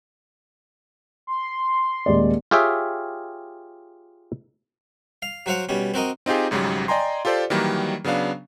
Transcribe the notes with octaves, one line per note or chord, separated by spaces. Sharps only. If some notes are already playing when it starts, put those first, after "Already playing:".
C6
D#1 G#3 D5
F4 G4 G#4 C#5 E5 G5
F5
F#3 F#4 C5 F5 F#5
B2 G3 C#4
C4 F#4 A#4 D#5
C4 D#4 F4 G4 G#4
G#1 G#2 C#3 F#3 G3
D5 D#5 G5 G#5 A#5 C6
F4 G4 A4 C5 D5
D#3 E3 F#3 G3 A#3
C#3 F#3 B3 D4 F5